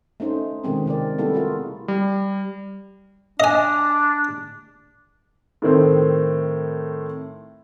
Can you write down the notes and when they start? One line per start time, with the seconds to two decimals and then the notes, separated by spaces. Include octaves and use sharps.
0.20 A3 C#4 D#4 C5
0.64 B2 D#3 G#3 C4 C#4
0.86 C3 C4 A#4 D5
1.18 G3 A3 B3 E4 A4
1.33 F4 F#4 G#4 A#4
1.88 G3
3.40 D4 D#5 G#5
5.62 A2 D#3 C4